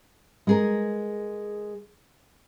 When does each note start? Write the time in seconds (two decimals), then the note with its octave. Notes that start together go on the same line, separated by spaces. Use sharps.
0.47 G#3 G#4 A#4